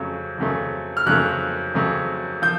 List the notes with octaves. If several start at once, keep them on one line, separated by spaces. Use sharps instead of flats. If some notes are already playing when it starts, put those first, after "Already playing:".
Already playing: F2 C#3 F#3 A3
F2 C#3 F#3 A3
F6
F2 C#3 F#3 A3 F#6
F2 C#3 F#3 A3
F3 G6